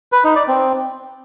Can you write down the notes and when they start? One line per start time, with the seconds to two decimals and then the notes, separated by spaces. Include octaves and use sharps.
0.12 B4
0.24 D#4
0.36 D5
0.48 C4